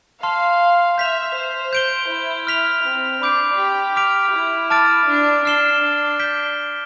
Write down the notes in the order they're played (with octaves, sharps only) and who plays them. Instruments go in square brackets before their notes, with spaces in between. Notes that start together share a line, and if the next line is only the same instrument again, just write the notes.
[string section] F5 [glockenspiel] A5 C6 F6
[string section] E5 [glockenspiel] G6 B6 F7
[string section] C5
[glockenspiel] G6 D7 G7
[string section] E4
[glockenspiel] F6 B6 F7
[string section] C4
[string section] D4 [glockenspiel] B5 D6 G6 D7
[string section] G4
[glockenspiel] D6 F6 B6 D7 F7
[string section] E4
[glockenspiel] A5 D6 F6 A6 D7
[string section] D4
[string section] D4 [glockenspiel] F6 C7 E7 G7
[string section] D4
[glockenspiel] G6 B6 D7 G7